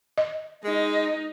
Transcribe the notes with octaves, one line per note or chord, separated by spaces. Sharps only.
D#5
G#3 D#4